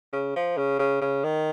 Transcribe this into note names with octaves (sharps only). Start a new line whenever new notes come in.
C#3
F3
C#3
C#3
C#3
D#3